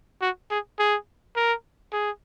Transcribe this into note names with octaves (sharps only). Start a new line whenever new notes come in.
F#4
G#4
G#4
A#4
G#4